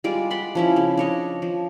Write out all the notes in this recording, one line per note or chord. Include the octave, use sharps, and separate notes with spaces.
G3 G#3 F4 D5
D5 F#5 B5 C6
F3 C#4 E4
C#3
D4 C#5 D#5
F3